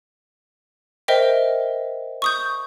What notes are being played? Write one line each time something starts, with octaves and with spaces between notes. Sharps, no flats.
A#4 C5 D#5 E5 G5
C#6 D#6 G6